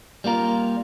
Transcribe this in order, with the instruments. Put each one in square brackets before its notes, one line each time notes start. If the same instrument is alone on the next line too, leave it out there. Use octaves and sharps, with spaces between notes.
[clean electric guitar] G3 A#3 F4 A#4